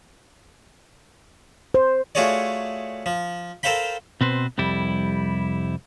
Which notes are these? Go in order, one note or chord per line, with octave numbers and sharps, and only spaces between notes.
C5
A3 F4 F#4 G#4 C#5 D5
F3
A4 A#4 C5 F5 G5 B5
B2 C4 B4 C5
C2 F2 G3 E4